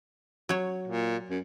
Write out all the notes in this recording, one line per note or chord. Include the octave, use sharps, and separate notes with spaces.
F#3 C#5
A#2
F#2